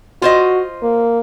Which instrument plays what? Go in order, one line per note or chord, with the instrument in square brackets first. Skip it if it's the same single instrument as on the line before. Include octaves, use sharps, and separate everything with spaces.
[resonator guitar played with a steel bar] F4 C5 D#5 [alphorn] F#4
[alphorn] A#3